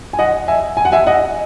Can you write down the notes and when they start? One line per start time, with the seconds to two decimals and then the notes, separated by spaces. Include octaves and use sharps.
0.13 G#5
0.19 D#5 F#5
0.48 E5 G#5
0.77 G#5
0.85 F#5
0.92 E5 G#5
1.07 D#5 F#5